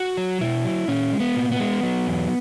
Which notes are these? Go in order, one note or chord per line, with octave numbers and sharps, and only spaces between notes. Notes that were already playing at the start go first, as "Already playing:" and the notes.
Already playing: F#4
F#3
B2 E4
F#3
A#2 C#4
G#3
B3
A#2
B3
G#3
F#3
E2